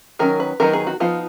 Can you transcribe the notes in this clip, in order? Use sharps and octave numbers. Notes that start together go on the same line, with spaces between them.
D#3 F#3 C#4 A#4
B4
D#3 F#3 B3 D#4 A#4
G#4
F#4
F3 B3 D#4 F4